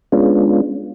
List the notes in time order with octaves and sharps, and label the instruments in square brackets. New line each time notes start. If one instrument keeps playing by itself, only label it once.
[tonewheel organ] G#3 B3 C#4 D4 F4